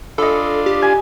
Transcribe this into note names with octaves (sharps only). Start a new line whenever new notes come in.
D4 F4 A4 D#5 B5
G4
G#5